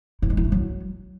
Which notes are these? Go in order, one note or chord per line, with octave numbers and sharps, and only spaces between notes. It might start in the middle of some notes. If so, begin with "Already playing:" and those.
E4
G#3
E4
A3
F#3